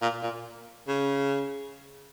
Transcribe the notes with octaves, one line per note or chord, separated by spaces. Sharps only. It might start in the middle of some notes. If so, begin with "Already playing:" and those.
A#2
A#2
C#3